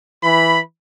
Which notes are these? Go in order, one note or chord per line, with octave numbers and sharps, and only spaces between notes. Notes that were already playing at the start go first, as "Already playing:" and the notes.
E3 B5